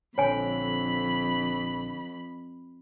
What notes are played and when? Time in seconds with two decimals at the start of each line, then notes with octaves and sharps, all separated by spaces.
0.18 A#1 F2 D3 C#5 G#5 B5